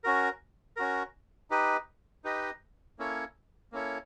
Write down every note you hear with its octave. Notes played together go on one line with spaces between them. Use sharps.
C#4 F#4 A#4
C#4 F#4 A#4
D#4 G4 B4 D#5
D#4 G4 B4 D#5
A#3 C#4 E4 A4 C#5
A#3 C#4 E4 A4 C#5